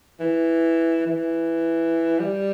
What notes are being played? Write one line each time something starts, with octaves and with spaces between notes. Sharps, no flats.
E3
E3
G3